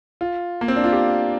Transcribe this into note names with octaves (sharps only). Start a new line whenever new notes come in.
F4
A#3
C4
D4
F4
G4